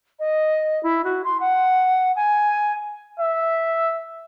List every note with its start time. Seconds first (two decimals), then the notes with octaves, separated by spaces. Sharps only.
0.19 D#5
0.83 E4
1.04 F#4
1.24 C6
1.40 F#5
2.16 G#5
3.19 E5